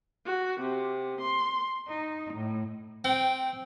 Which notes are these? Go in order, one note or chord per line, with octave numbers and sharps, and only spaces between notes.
F#4
C3
C6
D#4
A2
C4 G5